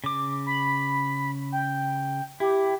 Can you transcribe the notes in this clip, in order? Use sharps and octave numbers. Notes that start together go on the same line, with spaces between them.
C#3 D6
B5
G5
E4 G4